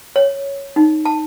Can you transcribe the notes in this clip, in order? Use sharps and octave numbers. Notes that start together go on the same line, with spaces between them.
C#5
D#4
A5